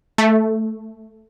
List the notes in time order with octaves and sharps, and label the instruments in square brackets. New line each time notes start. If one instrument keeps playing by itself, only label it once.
[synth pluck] A3